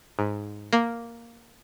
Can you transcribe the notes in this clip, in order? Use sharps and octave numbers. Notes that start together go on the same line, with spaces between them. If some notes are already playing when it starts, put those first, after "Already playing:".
G#2
A#3